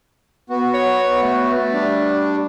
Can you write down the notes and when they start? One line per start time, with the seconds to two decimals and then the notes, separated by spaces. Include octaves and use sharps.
0.50 B3 F#4
0.74 C#5
1.22 A3
1.73 G3 D4